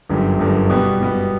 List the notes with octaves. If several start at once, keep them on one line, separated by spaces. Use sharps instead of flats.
G1 F#2 D3 G3
G1 F#2 D3 G3
B2 G3 B3
B2 G3 B3